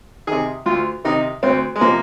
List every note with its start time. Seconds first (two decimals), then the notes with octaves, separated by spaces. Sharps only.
0.27 C3 D#3 G#4
0.66 D2 F4
1.05 C3 D#3 D#4
1.43 D2 C4
1.76 G#3
1.81 C3 F3 A#3